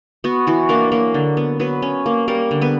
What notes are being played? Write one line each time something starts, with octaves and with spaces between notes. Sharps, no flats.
B3 F#4
E3 F#4
A#3 D4 A#4
F#3 A#3 A#4
D3
B3
F#3 B3 B4
C#4
A#3
G3 A#3 A#4
D3
B3 B4